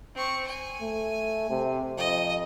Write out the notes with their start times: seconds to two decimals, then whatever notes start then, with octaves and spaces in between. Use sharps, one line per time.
0.15 C4 C#6
0.47 G#5
0.82 A3
1.50 C3
1.97 F2 D#5